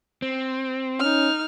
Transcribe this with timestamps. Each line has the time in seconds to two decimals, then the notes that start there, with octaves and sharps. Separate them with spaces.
0.22 C4
1.00 C#4 D#4 F6